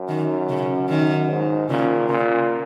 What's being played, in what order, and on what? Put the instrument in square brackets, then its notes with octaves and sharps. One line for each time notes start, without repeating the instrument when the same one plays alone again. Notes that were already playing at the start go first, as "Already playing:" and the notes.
Already playing: [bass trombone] F#2
[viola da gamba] D#3
C#3
[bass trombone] F#2 [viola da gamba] D#3
[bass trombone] G#2
[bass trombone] A#2 [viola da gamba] C#3
[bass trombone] A#2 [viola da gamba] C#3